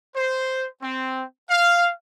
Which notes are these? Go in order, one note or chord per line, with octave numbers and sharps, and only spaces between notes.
C5
C4
F5